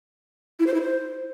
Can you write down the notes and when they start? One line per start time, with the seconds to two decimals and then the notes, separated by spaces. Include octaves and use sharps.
0.59 E4
0.67 C5
0.74 E4
0.81 C5